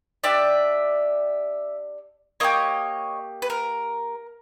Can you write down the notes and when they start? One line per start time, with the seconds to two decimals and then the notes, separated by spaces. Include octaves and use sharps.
0.23 D4 G4 D5 E5
2.40 A#3 D#4 G4 C#5 D#5
3.42 B4
3.50 A#4